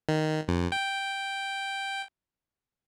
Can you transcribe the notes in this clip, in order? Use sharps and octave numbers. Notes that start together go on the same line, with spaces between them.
D#3
F2
G5